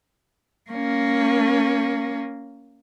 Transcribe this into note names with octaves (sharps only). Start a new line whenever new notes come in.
A#3 C#4